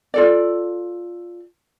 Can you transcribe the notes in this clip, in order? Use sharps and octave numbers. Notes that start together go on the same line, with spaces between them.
F4 A4 D5